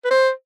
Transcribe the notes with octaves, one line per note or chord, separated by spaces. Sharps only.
B4
C5